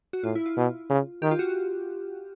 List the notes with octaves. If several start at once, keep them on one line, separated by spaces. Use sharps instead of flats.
F#4
A2 F4
E4
F4
B2
C#3
D#3 G4
F4
F#4